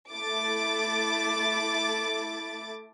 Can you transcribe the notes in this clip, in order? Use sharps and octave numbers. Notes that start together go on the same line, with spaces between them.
A3 E4 D6 A6